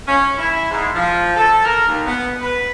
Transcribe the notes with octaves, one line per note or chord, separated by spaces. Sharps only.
C#4
E4
G#2
F3
A4
A#4
D#2
B3
B4